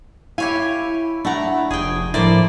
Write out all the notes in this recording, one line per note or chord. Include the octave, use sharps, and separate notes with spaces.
E4 G4 C#5 F5 G#5
A3 D4 F#5 A#5
F1 G#4 G5
A2 F3 A#3 E4 C5 D5